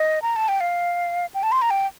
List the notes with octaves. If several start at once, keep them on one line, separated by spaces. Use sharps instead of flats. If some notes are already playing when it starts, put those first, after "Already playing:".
Already playing: D#5
A#5
A5
G5
F5
G5
A5
C6
A#5
G5